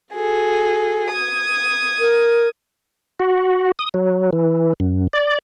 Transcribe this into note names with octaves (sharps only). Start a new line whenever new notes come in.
F#4 G#4 A4
D#6 G#6
A#4
F#4
D#6
F#3
E3
F#2
D5